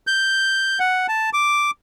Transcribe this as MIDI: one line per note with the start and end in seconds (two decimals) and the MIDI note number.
0.07 0.79 91
0.80 1.07 78
1.08 1.30 81
1.33 1.71 86